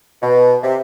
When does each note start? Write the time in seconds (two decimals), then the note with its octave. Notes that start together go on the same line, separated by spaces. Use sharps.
0.22 B2
0.63 C3